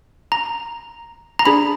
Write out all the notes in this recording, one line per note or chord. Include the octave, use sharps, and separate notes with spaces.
A#5
A#5
D4 G#4 B5